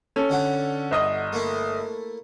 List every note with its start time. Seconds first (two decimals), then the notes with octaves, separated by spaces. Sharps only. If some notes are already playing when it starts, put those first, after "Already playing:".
0.16 C#4 A4
0.30 D3 E4 F#4
0.91 G1 D#5 D#6
1.33 A3 A#3 E4